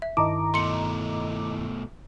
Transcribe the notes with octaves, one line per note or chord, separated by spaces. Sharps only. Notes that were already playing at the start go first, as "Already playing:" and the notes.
E5
G2 D#3 E4 D#5 A5 A#5 D6
B2 A3 C6 C#7